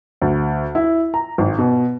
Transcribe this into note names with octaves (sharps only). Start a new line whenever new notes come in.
D2
E4
A#5
G#1
B2